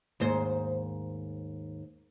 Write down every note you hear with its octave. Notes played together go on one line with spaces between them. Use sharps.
D#2 G#2 C5